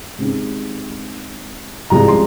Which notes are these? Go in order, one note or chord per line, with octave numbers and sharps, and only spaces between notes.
C3 D#3 G#3 C4
C2 C3 F3 G#3 A#5
C6